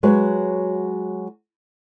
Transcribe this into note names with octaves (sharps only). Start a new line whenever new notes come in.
F#3 G#3 F#4 B4 C#5